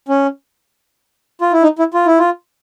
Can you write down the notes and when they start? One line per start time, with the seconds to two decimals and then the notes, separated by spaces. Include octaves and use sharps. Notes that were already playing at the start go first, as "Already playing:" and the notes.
0.08 C#4
1.41 F4
1.52 E4
1.63 D#4
1.79 E4
1.94 F4
2.06 E4
2.19 F4